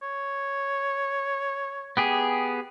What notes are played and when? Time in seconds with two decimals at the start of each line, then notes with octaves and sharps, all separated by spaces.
0.02 C#5
1.97 B3 G4 G#4